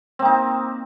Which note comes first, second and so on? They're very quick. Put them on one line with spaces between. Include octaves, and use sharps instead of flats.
C4 A#3 D#4